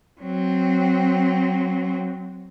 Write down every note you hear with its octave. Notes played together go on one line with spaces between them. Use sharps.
F#3 C4